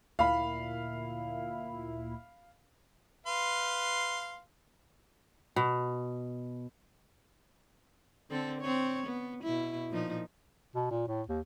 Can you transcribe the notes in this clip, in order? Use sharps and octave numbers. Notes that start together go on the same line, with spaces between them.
D2 A#2 E4 F5 B5
B4 F5 C6
B2
D3 C4 A4
C4 C#5
B3
B2 E4
A#2 F3 D#4
B2
A#2
A2
D#2